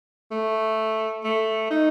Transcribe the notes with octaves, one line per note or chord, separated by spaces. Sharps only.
A3
A3
D#4